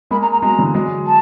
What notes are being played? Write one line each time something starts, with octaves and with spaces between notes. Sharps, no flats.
G#3 A#3 B5
A#5
A#5
F#3 G#3 A#5
D3 E3
F#3 G#3
A5